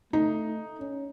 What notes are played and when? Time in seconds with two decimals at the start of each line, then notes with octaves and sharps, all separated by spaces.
0.13 A3 D#4
0.80 C#4